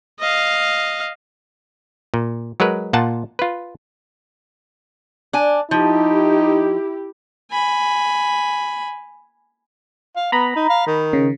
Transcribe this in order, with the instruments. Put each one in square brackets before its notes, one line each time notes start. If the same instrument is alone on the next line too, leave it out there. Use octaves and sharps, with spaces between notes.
[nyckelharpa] D#5 F5
[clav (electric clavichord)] A#2
F#3 G#3 A#4 B4
A#2 F4 F#5 A5
F4 B4
[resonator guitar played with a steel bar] D4 G#5
[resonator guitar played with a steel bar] F3 [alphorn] D#4 [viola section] E4 G4
[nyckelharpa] G#5 B5
[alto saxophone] F5
[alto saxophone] B3 [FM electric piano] A#5 B5
[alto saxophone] D#4
F5
D#3
[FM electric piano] C#3